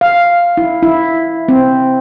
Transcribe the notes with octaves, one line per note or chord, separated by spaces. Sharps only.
F5
E4
E4
C4